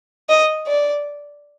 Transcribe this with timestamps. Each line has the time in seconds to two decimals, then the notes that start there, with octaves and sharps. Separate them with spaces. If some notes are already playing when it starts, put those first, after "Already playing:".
0.29 D#5
0.68 D5